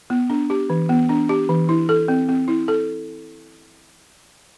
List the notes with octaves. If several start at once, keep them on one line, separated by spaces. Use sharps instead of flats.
B3
D4
G4
E3
B3
D4
G4
E3
E4
A4
C4
C4
E4
A4